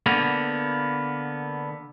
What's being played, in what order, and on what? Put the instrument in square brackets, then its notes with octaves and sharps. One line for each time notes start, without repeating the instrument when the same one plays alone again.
[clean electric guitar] D3 A#3 B3